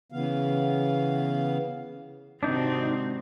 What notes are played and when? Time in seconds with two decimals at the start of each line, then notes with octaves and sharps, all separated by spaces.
0.12 C#3 E3 B3 F5
2.43 G#2 C3 D#3 C4 D4 D#4 F#4